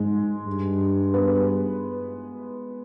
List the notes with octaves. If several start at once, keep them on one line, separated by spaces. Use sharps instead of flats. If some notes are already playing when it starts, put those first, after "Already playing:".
Already playing: G#2 G#3 G#4
G2
B3 B4